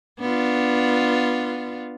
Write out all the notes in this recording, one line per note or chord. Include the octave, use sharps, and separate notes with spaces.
B3 D4 F4